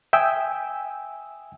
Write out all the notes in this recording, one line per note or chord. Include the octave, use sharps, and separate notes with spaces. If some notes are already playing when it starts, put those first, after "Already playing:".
E5 G5 G#5 D#6 E6